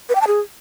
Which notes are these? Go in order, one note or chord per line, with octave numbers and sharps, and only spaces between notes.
B4
G5
A5
G#4